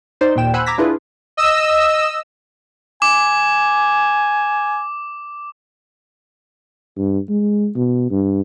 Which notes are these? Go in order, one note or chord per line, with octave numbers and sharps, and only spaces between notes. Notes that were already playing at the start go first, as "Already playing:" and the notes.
D#4 C5 D5 C6
D#2 A#2 G5 E7
C5 F#5 G#5 B5 E6 F#6
A#5 D6 E6 G#6 A#6 B6
D4 E4 F4 G#4 B4
D#5 E6
G#5 D6
G2
G#3
B2
G2